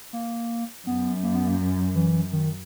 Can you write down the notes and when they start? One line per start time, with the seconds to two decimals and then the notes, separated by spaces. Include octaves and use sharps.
0.13 A#3
0.86 F#2 B3
1.23 A#3
1.35 B3
1.47 A#3
1.95 E3
2.33 D#3